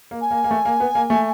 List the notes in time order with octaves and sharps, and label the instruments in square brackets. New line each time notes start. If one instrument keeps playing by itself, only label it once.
[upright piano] A#3
[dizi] G#5
[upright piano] A#3
A#3
A3
A#3
B3
A#3
A3